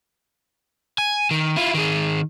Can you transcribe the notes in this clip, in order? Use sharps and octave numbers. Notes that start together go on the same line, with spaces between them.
G#5
D#3
E4 F4
D#3 G#4